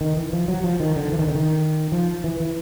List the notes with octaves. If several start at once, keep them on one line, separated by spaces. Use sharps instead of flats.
D#3
E3
F3
F#3
F3
D#3
D3
E3
D#3
D3
D#3
F3
E3
E3